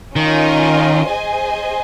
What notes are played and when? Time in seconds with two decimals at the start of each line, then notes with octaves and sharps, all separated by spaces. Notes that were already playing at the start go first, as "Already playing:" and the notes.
0.16 D#3 C#4 F4 A#4 D#5
1.10 G#4 C5 D#5 G#5